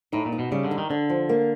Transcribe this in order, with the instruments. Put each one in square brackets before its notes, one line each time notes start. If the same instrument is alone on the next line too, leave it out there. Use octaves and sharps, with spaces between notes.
[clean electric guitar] A2 [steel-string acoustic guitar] D#4
[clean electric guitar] A#2
[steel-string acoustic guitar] D#4
[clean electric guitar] B2
[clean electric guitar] C#3 [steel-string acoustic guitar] G3
[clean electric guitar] D3
[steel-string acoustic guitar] D#4
[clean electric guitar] D#3
[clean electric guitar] D3 [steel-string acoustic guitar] D4
[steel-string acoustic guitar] F3
A#3